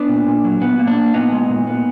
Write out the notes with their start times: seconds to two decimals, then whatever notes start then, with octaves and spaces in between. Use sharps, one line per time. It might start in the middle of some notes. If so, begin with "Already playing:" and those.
Already playing: B3 D4
0.09 A#2
0.27 A#2
0.45 F#3
0.61 A#2 B3
0.79 A#3
0.87 D4
0.97 A#3
1.14 A#2 B3 D#4
1.32 G#3
1.49 A#2
1.67 B3